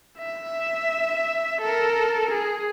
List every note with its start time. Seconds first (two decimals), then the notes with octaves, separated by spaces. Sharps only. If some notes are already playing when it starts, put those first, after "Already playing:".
0.19 E5
1.61 A4 A#4
2.31 G#4